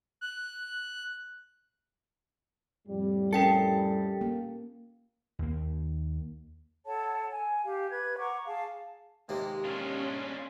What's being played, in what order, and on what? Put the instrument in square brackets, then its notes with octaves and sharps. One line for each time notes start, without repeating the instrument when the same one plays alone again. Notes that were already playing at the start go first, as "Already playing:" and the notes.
[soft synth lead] F#6
[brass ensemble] F2 A2 G3
[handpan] C#4 [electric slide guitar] G4 A4 [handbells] A#4 G5 C#7
[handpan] A#3
[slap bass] D#2 A#3
[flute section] A4 C#5 F#5 A5
G#5
G4 F5
B4 G#6
F#5 A#5 C#6 D6
G#4 F5 A5
[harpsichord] D#2 C3 A#3 [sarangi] G#3
[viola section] C#4 [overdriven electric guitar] D4 F4